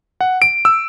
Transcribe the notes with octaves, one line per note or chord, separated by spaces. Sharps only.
F#5
D7
E6